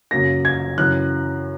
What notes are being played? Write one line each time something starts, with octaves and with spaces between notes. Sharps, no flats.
F#2 C#3 F#3 A#3 A#6
G#6
F#2 C#3 E3 F#6